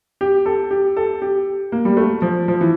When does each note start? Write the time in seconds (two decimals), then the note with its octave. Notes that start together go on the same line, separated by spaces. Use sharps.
0.21 G4
0.46 A4
0.71 G4
0.97 A4
1.22 G4
1.72 A#3
1.85 G3
1.97 A3
2.22 F3
2.48 F3
2.61 E3